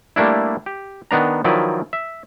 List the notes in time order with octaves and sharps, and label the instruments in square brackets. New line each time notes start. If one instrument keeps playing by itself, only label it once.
[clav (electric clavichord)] G3 A3 A#3 D4 E4
G4
D#3 B3 D4 A#5
D#3 F3 F#3 E4 B4 D5
E5